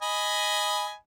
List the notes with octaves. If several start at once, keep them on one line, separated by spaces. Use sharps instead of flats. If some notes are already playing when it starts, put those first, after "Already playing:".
D#5 G#5 B5